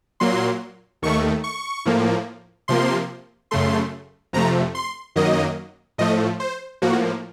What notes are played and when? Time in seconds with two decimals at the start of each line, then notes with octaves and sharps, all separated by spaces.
0.20 A#2 F#3 A#3 C6
1.02 D#2 D#3 A3 C#6
1.44 C#6
1.85 A2 F3 A#3
2.68 C3 F3 A#3 C6
3.51 F#2 C#3 A3 C6
4.33 F2 C3 F3 A3 A#5
4.75 C6
5.16 F#2 D#3 F#3 A#3 D#5
5.98 A2 F3 A3 D#5
6.40 C5
6.82 A2 F3 A#3 F#4